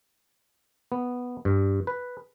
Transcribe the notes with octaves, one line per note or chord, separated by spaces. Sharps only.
B3
G2
B4